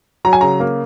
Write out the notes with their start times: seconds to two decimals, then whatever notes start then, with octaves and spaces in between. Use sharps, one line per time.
0.25 F#3 A#5
0.33 G#5
0.41 C#3 A#5
0.60 A#3